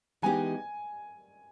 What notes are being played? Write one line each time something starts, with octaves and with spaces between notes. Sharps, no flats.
E3 G#3 B3 D#4 G4 G#5